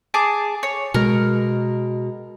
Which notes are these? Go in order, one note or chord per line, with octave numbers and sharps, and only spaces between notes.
G#4 A5 D6
C#5
B2 G#3 A#4